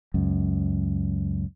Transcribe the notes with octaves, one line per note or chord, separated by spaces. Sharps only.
C#2 F#2